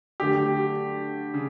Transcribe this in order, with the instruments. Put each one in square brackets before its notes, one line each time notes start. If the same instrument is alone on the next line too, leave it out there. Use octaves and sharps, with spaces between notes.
[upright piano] D3 F#3 A3 [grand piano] G4
[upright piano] C#3